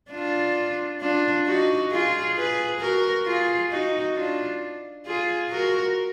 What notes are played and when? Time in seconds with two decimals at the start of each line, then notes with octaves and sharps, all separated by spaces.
0.11 D4 F4
1.01 D4 F4
1.46 D#4 F#4
1.91 F4 G#4
2.37 G#4 B4
2.81 F#4 A#4
3.26 F4 G#4
3.71 D#4 F#4
4.15 D4 F4
5.06 F4 G#4
5.50 F#4 A#4